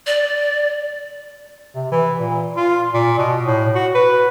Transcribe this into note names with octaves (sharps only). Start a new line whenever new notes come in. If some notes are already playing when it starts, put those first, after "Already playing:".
D5
C3
E3
A#2
F4
A#2
B2
A2
F#4
B4